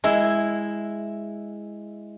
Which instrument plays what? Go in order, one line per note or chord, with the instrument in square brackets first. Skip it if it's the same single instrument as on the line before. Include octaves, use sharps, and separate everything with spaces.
[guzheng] G#3 E4